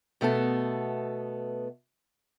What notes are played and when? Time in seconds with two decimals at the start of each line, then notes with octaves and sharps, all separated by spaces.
0.21 B2 A3 B3 A4